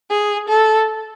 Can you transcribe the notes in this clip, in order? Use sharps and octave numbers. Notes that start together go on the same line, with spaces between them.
G#4
A4